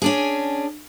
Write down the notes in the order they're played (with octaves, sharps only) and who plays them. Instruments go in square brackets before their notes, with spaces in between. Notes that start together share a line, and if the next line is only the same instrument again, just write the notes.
[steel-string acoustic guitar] C#4 D4 G#4